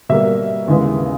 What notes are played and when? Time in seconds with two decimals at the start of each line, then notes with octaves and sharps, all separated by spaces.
0.09 B2 G3 A#3 E5
0.68 D#2 C#3 E3 G#3 B3